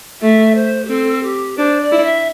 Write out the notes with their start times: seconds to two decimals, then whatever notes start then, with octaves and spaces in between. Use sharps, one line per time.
0.21 A3 E5
0.55 C5
0.85 G4
0.89 C4 A4
1.23 G4
1.58 D4 C5
1.81 D5
1.92 E4
2.04 E5